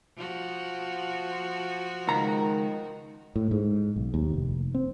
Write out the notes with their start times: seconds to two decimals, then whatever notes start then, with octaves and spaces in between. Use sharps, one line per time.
0.17 F3 F#4
2.07 C#2 D#3 A#5
3.36 A2
3.51 G#2
3.96 B1
4.14 D#2
4.34 F1
4.75 C4